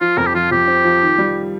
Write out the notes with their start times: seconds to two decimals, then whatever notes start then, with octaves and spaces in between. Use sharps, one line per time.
0.01 F3 F4
0.17 F2 A#4
0.27 G4
0.34 F3 F4
0.51 F2 G4
0.68 C4
0.84 F3
1.02 D#3
1.18 G3